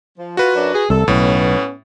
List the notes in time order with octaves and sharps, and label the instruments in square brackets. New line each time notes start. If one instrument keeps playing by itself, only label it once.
[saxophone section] F3
[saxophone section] F4 [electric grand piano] F#4 B4
[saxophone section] F#2 F#3 D4
G#4
[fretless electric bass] C2 [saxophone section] A4
[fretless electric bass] B1 [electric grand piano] A2 [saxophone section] B3 C#4